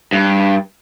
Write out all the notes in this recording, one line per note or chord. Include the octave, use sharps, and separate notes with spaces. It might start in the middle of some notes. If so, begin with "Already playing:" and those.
G2